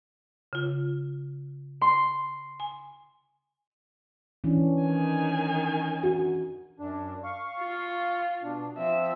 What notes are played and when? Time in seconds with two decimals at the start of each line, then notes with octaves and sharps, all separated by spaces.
0.53 C#3 F4
1.81 C6
2.60 G#5
4.44 E3 C#4 D4
4.83 D#3 G#5
6.03 F#4
6.80 F#2 D4
7.24 F5 C#6
7.60 F4
8.43 B2 D4
8.78 F3 C4 E5